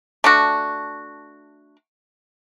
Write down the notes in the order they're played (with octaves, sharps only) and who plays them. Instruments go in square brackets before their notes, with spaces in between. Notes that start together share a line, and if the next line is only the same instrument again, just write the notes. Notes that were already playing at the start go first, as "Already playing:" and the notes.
[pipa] A3 D4 F#4